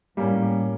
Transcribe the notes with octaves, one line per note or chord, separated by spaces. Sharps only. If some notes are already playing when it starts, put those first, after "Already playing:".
A2 G3 A#3 C#4